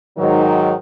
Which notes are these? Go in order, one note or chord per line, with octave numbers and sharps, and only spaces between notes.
G#2 D#3 F#3